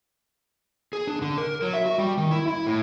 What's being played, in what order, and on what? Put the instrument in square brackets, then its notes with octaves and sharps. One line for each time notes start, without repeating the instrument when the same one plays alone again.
[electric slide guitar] G#4
D4
D3
A#4
F#3
E5
F#4
G3
D#3
E4
E4
A2